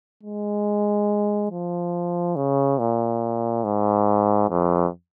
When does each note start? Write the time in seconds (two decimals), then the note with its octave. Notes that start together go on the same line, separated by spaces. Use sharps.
0.23 G#3
1.51 F3
2.36 C#3
2.79 A#2
3.64 G#2
4.50 F2